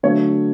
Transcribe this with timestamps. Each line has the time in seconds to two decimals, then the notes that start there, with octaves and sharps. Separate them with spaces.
0.03 D3 F#3 A3 C#5